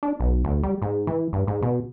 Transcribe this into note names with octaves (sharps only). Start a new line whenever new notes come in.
D4
B1
D2
G3
G#2
E3
G2
G#2
B2